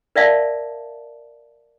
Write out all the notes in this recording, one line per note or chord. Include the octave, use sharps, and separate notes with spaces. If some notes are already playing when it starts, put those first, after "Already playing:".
A#4 D5 E5 F5 A5